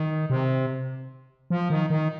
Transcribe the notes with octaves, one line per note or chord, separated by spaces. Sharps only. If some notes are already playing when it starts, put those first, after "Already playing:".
Already playing: D#3
C3
F3
D#3
D#3